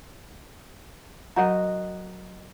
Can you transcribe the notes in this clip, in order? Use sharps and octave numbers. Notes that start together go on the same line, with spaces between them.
F#3 F#4 A#4 D#5 F#5 A#5